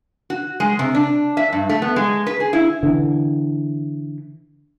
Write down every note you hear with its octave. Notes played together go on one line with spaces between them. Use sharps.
F#4
G#3
C3
D4
E5
G2
A3
B3
G#3
B4
G#4
E4
D3 E3